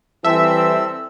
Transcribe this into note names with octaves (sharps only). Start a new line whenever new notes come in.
E3 G3 C4 A4 E5 E6